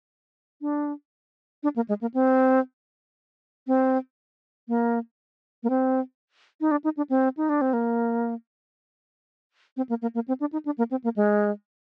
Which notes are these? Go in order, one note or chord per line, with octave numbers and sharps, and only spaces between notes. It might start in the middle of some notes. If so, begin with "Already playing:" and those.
D4
D4
A#3
G#3
A#3
C4
C4
A#3
A#3
C4
D#4
D4
D#4
D4
C4
D#4
D4
C4
A#3
C4
A#3
A#3
A#3
C4
D4
D#4
D4
A#3
C4
A#3
G#3